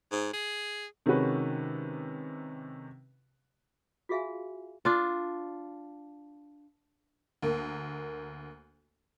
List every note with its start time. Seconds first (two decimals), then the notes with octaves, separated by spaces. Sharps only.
0.12 G#2
0.33 G#4
1.06 C3 D#3 G#3 C#4 F#4 B4
4.09 F4 F#4 G#4 E5 F5 G#5
4.85 D4 F4
7.42 D2 A#3